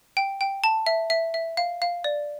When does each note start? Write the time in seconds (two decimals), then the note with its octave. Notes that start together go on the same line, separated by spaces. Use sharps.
0.17 G5
0.41 G5
0.64 A5
0.86 E5
1.10 E5
1.34 E5
1.57 F5
1.82 F5
2.04 D5